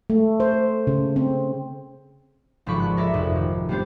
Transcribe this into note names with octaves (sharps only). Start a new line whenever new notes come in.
A3
C5
C#3
C4
G#1 C#2 F3 D5 B5 C#6
F#6
A#4 C#5 D5 E5
F1 F2
D#3
G3 A#3 B3 D4 G4 C5